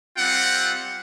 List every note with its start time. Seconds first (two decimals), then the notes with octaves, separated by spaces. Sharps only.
0.17 G3 C4 F4 F#5